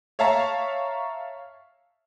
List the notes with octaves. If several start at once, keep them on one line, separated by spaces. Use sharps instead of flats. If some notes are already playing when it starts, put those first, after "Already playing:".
C#5 E5 F5 A5 A#5 C#6